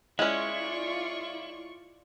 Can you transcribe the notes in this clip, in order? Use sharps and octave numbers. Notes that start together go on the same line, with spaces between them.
G#3 C#4 E4 F4 D5 C#6